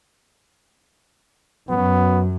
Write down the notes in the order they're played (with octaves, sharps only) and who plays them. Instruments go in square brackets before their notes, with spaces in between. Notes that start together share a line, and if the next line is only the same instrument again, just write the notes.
[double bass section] F#2 F#3 [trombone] B3